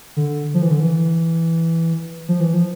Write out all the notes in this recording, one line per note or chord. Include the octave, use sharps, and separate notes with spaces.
D3
F3
E3
D3
E3
F3
E3
F3